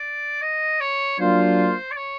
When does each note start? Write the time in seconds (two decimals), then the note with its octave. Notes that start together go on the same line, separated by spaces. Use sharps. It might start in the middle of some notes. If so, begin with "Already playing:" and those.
Already playing: D5
0.42 D#5
0.80 C#5
1.19 F#3 A#3 D4 F4 C5
1.92 D5
1.97 C#5